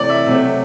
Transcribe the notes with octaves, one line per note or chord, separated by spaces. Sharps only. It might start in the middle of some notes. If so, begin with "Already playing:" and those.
Already playing: C3 E3 A3 D5
E5
C3 F#3 A3 C4